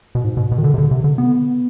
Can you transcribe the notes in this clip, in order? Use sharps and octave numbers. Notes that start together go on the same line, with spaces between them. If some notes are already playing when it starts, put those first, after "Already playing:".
B2
G#2
B2
B2
D#3
D3
C3
D3
C3
D3
B3